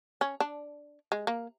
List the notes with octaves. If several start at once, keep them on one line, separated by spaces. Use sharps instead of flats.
C#4
D4
G#3
A#3